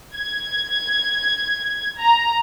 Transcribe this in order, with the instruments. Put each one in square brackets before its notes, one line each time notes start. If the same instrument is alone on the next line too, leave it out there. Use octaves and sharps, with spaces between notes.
[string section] G#6
A#5